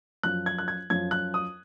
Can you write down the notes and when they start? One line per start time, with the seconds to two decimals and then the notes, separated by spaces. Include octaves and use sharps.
0.23 F#2 F3 F#6
0.46 G#6
0.58 F#6
0.68 G#6
0.90 F#2 F3 G#6
1.11 F#6
1.34 D#6